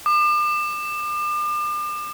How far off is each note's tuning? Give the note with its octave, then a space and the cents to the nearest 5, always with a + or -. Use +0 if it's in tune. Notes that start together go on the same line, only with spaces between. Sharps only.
D6 +40